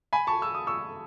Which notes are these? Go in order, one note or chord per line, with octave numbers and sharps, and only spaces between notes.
G#5 B5
A5 C#6
E6
D#6
C#6 E6